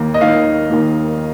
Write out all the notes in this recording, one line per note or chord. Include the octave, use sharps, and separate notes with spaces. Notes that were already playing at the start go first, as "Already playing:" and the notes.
Already playing: D#2 D#3 A#3
D#5
D#2 D#3 A#3 F5
D#2 D#3 A#3